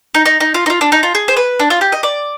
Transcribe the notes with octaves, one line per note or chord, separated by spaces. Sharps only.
D#4
D#4
D#4
F4
D#4
F4
D4
D#4
F4
G#4
C5
B4
D4
F4
G4
D#5
D5